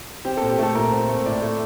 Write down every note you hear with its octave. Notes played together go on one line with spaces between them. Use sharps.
C4 G4
A#2 A4
G4
A3 A4
A#2 A#4
C4
A3
A2 D5
A3